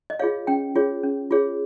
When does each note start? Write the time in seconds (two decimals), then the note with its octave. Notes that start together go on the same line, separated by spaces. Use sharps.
0.10 D#5
0.19 F4 G#4 C#5 F5
0.47 C#4 G5
0.75 F4 G#4 C#5
1.03 C#4
1.31 F4 G#4 C#5